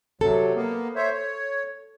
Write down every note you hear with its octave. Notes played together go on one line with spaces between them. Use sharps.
C3 F#3 A4
A#3 B3
C5 C#5 E5
C#5